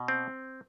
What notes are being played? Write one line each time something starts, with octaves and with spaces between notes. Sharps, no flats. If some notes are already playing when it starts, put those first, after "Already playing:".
Already playing: B2
C4